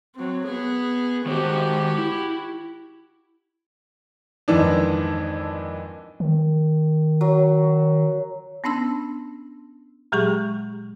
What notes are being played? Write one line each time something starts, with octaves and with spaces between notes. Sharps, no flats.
F#3 C4
B3 G#4
D#3 G#3 F#4 G4 C5
E4
F2 G#2 D#3 E3 D4
D#3
F#3
B3 C#4 D4 A5 E6
A#2 F#3 G#3 G4 G#4 C#6